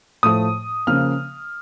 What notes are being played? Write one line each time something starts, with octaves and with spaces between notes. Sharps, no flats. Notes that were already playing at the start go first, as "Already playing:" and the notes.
A2 F3 A3 D#6
C#3 F3 A#3 F6